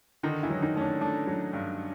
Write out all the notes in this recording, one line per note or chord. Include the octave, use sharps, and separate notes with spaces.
D3 D#3 D#4
E3 E4
F#3
D#3 D#4
A3 C#4
D4
A3 D4
F#3
G2